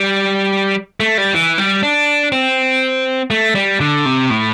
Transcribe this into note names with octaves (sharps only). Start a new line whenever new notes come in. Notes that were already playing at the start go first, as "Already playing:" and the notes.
Already playing: G3
A3
G3
E3
G3
D4
C4
A3
G3
D3
C3
A2